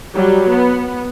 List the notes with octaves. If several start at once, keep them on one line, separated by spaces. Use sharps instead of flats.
F#3 G3
B3